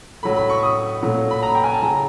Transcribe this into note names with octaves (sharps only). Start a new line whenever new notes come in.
A2 F#3 A3 B5
B5
C#6
D#6
A#2 F#3 A3
B5
A#5
G5
G#5
A5
C#3 F#3 A#5